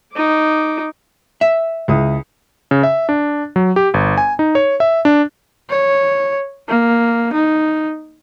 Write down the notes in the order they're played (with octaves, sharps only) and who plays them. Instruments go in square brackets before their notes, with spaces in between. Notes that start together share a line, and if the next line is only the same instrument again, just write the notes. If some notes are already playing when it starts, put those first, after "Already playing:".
[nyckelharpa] D#4 D6
[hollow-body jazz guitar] E5
[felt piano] C#2 E4 D#6
[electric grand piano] C#3
E5
D4
F#3
G4
G1
G#5
D#4
C#5
E5
D4
[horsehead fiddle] C#5
A#3
D#4